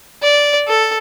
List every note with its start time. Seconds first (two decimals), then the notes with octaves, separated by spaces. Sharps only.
0.23 D5
0.68 A4